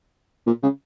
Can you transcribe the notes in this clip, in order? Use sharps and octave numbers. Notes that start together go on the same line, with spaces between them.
A#2
C#3